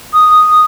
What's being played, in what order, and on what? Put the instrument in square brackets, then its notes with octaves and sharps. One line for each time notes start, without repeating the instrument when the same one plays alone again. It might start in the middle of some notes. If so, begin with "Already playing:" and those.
[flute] D#6